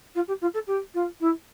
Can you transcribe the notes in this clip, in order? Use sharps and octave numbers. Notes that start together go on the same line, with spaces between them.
F4
G4
F4
A4
G4
F4
E4